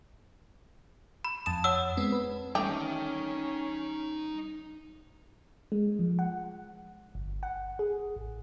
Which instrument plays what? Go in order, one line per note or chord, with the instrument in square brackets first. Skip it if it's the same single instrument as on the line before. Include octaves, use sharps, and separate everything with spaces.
[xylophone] B5
[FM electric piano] F2 A5 D#6 [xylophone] E7
[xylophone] C#5 F#5 E6
[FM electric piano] G#3 B3 C4
B4
[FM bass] G3 [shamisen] A3 G4 [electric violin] C#4 [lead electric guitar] D#4 G5
[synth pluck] G#3
F3
F#5
G1
F#5
G#4
A1